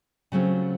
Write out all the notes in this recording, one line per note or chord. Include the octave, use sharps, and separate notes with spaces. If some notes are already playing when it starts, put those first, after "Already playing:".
C#3 F#3 A3 C4 F4